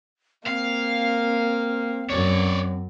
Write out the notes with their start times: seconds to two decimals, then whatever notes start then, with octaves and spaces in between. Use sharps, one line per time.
0.47 A#3 C4 F5
2.10 F#2 F#3 C#5 D5